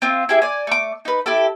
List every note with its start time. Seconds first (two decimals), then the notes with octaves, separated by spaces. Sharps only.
0.02 C4 F4
0.29 E4 G4 G#4 E5
0.42 D5 G#5
0.67 A3 D6
1.05 D#4 B4
1.26 E4 G4 A4